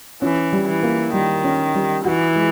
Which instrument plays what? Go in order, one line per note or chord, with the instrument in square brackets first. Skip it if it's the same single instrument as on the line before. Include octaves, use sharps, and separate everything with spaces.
[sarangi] E3 [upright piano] C#4
[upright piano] G3
[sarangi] E3
[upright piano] A#3
[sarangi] D#3 [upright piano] G3
[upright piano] C#4
G3
[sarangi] E3 [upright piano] F#4
[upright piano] G#3